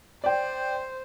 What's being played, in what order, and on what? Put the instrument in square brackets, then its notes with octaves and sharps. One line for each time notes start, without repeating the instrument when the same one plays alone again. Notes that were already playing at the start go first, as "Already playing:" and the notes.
[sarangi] C5 [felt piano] D5 G5